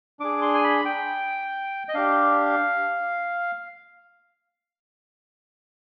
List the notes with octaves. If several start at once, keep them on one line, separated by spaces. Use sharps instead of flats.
D4 G#4 D6
C6
G#5
B5
G5
D#5
D4 G4 F5